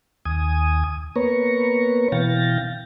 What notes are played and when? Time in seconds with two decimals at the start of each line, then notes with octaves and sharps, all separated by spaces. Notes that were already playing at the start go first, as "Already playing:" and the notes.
0.26 D#2 G#5 D#6
1.16 A#3 B3 B4 C#5 A#5 C#6
2.12 B2 E3 F5 G5 A6 A#6